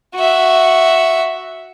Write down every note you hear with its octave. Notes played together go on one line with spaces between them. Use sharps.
F#4 E5